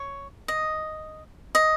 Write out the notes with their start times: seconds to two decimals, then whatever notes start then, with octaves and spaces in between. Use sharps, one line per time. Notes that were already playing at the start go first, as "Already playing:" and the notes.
Already playing: C#5
0.48 D#5
1.55 D#5